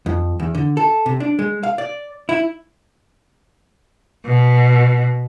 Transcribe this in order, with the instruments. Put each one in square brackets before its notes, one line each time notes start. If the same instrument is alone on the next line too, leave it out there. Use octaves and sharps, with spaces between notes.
[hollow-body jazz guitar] F2
E2
D3
A4
C3
D4
G#3
F5
D5
E4
[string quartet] B2